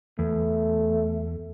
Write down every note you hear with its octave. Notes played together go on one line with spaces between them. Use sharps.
E2 A3